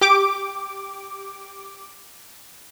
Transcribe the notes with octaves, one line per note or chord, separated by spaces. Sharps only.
G4 D6